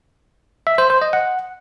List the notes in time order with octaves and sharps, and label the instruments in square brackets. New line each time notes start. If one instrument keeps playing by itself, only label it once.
[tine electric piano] E5
C5
C5
D#5
F#5